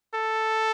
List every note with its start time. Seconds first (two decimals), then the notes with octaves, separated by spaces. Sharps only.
0.14 A4